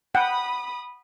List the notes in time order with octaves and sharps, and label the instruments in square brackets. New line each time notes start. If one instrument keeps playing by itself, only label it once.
[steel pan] F#5 G5 [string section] B5 D#6